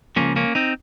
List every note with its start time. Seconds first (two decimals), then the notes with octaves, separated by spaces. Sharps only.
0.16 C#2 C#3 F3 A#3 C#4
0.36 A#3 C#4
0.55 C4 D#4